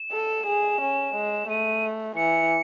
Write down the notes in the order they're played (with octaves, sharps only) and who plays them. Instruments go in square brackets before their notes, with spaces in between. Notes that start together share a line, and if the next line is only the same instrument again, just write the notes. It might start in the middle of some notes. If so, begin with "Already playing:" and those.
Already playing: [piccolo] E7
[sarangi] A4
G#4
C#4
G#3
[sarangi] A3 [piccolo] D#7
[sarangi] E3 [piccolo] C#7